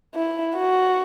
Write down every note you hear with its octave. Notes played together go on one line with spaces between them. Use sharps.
E4
F#4